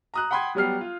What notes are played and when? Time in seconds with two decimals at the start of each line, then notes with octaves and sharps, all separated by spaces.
0.14 A#5 D#6 F#6
0.31 F#5 G5 B5 C6 D#6 G#6
0.55 F#3 G3 B3 G4 F6 C7
0.81 F4